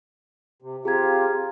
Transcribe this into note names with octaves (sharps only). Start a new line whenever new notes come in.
C3
C4 F4 G4 G#4 A#5 G#6